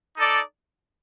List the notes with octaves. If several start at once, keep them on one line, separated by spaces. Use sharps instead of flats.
D#4 A4 D5